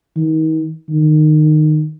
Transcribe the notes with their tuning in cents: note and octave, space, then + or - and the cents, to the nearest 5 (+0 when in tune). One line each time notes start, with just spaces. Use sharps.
D#3 +35
D#3 -20